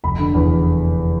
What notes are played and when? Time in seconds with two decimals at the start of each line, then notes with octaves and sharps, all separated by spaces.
0.04 F1 B5
0.19 D3
0.34 E2